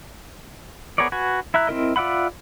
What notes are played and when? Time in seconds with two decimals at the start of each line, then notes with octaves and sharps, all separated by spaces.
0.98 B3 G#4 A#4 C#5 D5
1.12 F#4 B4 G#5
1.54 E4 E5 A#5 F#6
1.67 C4 E4 A#4 D#5
1.96 F4 D5 E5 F#5 B5